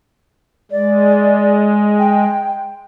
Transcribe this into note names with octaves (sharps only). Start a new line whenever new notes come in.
G#3 D5
G5